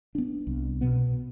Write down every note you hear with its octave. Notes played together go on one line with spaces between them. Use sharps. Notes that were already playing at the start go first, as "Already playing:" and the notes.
B3 D4
C2
B2 B3